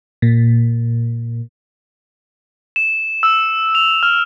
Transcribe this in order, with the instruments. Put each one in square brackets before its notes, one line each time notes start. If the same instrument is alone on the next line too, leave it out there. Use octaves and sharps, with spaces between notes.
[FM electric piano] A#2
[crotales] E7
E6
F7
F6